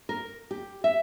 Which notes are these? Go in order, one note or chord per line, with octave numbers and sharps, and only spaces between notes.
A#4
G4
E5